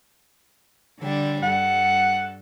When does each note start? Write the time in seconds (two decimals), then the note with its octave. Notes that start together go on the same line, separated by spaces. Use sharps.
0.99 D3 G3 D4
1.43 G2 A4 F#5